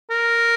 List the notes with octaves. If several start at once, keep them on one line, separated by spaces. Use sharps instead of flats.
A#4